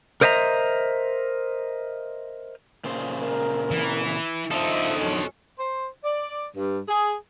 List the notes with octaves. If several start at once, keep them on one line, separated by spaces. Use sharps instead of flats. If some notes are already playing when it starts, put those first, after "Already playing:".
A#4 C5 D#5 E5 A5 A#5
A#2 C#3 C5
A#4
E3
D3 D#4 F4 A4 C5 D#5 E5
F2 F#3 C#4
C5
D5
G2
G#4